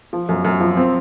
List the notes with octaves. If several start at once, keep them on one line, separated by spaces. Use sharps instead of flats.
F3
F#2
F#2
F3
C4